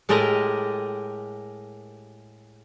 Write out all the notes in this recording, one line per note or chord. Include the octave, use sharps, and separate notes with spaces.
A2 G#3 G4 A#4 D#5 A#5